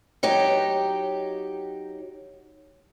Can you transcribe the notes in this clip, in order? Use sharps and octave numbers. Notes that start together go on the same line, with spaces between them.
F#3 D#4 G4